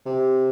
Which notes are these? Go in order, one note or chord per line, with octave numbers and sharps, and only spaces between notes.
C3